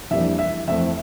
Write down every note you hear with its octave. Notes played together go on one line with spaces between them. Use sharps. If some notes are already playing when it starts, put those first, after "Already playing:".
F2 E3 G3 A#3 D4 E5
E5
F2 E3 A3 C4 E5